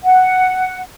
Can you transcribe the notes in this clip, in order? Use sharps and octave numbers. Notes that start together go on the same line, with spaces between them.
F#5